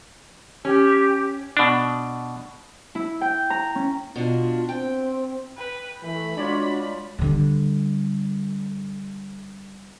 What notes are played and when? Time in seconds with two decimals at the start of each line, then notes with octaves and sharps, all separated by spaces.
0.65 C#4 G4
1.57 B2 D4
2.95 E4
3.21 G5
3.50 A#5
3.75 C#4
4.16 B2 D4 F4
4.69 C4 G5
5.58 B4 G5
6.03 E3 A3 B5
6.38 G#3 D4 F4 F#4 C#5 D5
7.19 D3 G3